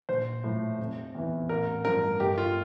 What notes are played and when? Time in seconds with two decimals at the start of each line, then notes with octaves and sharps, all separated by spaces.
0.09 A#1 C5
0.44 A2 F3
0.79 F1
1.15 E2 E3
1.49 A1 A#4
1.85 G2 F3 A#4
2.20 G1 G4
2.38 F4